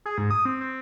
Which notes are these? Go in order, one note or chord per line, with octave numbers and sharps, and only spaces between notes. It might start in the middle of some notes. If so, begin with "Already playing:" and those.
G#4
G#2
D#6
C4
C4